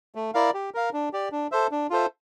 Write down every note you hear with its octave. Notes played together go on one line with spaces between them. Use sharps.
A3
E4 A#4 D5 F5
G4
A#4 F5
D4
G4 D5
D4
A4 C5 E5
D4
F4 A4 C5 E5